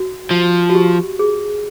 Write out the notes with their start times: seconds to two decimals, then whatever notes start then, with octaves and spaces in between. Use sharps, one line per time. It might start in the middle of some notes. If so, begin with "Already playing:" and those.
Already playing: F#4
0.31 F3
0.70 F#4
0.75 G4
1.19 G#4